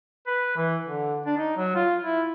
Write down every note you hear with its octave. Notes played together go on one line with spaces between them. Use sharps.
B4
E3
D3
D4
D#4
F#3
F4
E4